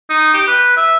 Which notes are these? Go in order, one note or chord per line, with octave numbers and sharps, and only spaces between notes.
D#4
G4
B4
E5